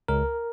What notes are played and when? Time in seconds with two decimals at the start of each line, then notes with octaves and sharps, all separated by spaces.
0.08 C#2 A#4